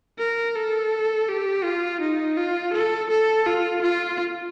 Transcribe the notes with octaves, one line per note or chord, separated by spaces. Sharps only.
A#4
A4
G4
F4
D#4
F4
A4
A4
F4
F4